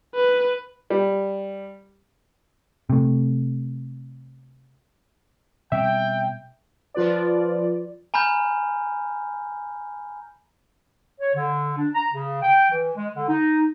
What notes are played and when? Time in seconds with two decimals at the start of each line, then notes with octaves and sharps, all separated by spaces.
0.15 B4
0.90 G3
2.90 C3 A3
5.72 B2 G3 C4 E5 G5
6.94 F3 F4 B4 D5
8.14 G#5 A#5 B5 F6 G6
11.20 C#5
11.35 D3
11.78 D4
11.95 A#5
12.12 C#3
12.42 G5
12.70 E3
12.96 G#3
13.15 D3
13.28 D#4